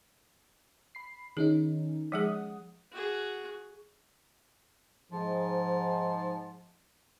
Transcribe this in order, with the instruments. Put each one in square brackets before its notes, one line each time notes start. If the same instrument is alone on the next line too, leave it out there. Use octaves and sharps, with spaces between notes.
[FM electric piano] B5 C7
[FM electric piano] D#3 C#4 D#4 [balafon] G#4
[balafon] F3 G#3 G#4 [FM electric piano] F#5 D#6
[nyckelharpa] F#4 G#4
[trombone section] G#2 [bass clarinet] F3